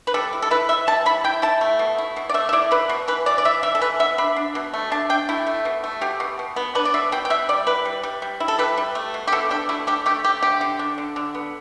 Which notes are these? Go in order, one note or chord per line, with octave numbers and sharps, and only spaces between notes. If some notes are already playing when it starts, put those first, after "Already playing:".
B4
G3 A4
E4
A4
E4 B4
E4 E5
G3 A5
E4 B5
E4 G5
E4 A5
A3
B2
E4
B2
D5
A3 E5
E5
E4 D5
B2 B4
B2
E3 B4
E3 D5
D5
E3 E5
E3 E5
A4
E3 B4
B3 E5
D4 B5
D4
B2
A3
D4 A5
D4 G5
A3 E4
A3
B2
A3
B2 G4
B2
B2
B3
D4 B4
D5
B2 E5
B2 G5
G5
B2 E5
G3 D5
E4 B4
G3
G3
G3
E4
A4
G3 B4
G3
A3
B2
G4
B2 A4
D4 G4
A3 E4
D4 G4
A3 G4
A3 G4
D3 G4
D3
D4
D3
D3
B3